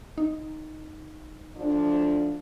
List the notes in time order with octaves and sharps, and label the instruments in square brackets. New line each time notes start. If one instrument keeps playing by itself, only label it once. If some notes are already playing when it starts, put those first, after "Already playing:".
[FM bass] D#4
[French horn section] D2 F3 D4